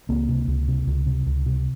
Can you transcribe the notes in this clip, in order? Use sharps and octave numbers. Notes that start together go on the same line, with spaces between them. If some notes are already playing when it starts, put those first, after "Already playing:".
C#2 A#3 C4
C3
C#2
C3
C#2
C3
C#2
C3